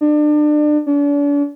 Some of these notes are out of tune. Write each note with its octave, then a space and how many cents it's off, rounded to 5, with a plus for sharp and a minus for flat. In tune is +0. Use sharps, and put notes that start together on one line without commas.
D4 +30
D4 -40